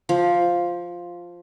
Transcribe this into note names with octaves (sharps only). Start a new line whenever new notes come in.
F3